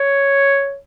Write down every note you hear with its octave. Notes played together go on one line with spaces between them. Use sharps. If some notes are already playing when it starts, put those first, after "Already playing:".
Already playing: C#5